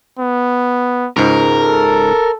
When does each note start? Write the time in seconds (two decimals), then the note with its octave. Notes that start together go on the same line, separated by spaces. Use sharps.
0.19 B3
1.17 C#2 G#2 A#4
1.62 A4